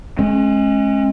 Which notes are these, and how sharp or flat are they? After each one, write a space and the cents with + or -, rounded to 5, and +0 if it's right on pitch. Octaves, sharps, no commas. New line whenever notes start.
G#3 +25 C#4 -30